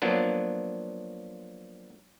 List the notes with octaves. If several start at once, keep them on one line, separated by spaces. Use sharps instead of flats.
F3 F#3 A#3 B3 D4